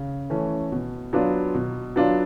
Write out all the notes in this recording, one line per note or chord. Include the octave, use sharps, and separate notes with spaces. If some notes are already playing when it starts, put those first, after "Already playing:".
Already playing: C#3
E3 A3 C#4
B2
F#3 B3 D4 F4
B2
F#3 B3 D4 F4